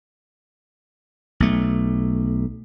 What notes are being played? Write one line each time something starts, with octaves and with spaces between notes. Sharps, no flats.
B1 A3